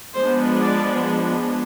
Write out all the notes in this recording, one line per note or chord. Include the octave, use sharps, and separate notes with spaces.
F3 G#3 B3 D4 C5
D5